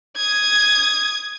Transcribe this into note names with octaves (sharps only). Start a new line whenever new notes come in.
D#6 G#6